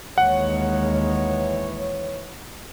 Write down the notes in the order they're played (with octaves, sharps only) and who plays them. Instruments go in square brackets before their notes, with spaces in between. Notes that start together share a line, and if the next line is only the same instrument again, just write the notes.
[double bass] D#2 G#3 [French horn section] E3 C#5 [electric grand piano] F#5